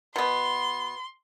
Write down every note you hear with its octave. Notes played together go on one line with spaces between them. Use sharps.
B2 B3 C6